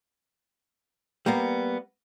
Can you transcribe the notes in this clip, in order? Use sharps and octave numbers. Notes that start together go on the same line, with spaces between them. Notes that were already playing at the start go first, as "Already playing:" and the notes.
G3 A#3 B3